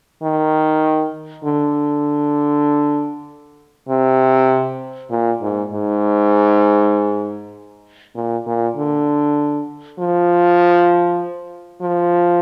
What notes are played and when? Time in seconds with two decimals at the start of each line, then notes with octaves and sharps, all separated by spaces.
0.23 D#3
1.44 D3
3.89 C3
5.10 A#2
5.41 G#2
5.72 G#2
8.15 A#2
8.47 A#2
8.77 D3
9.99 F3
11.82 F3